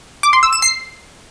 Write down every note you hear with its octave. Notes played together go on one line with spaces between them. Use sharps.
D6
C6
E6
E7
C7